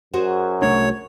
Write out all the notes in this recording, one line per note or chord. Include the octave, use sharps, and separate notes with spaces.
F#2 F#4 G#4 C5
C2 A3 D4 C#5